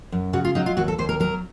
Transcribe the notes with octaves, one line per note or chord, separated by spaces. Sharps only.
F#2
C#3 F#4
F4
F#3 D#4
F4
D#2 F#4
A4
D#2 C5
A#4
F#3 A#4